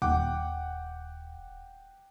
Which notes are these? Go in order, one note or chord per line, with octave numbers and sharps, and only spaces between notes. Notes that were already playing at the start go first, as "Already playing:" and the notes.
D#1 F#5 G5 D6